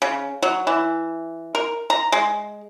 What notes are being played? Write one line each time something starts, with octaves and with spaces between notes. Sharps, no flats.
C#3
F#3
E3
A#4
A#5
G#3